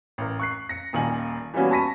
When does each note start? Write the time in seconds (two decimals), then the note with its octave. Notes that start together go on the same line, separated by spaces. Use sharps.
0.18 A1 A#4
0.39 C#6 F#6 C7
0.69 A#6 C#7
0.93 D#1 A#2 D#3 G#5 F#7
1.54 E3 G3 A#3 B3 C#4 F#4
1.71 A5 B5 C#6 A#6 B6 D#7